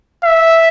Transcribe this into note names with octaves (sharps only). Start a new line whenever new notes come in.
E5